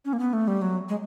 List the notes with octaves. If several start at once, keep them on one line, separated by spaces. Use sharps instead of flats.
C#4
A#3
B3
A3
G3
F#3
G#3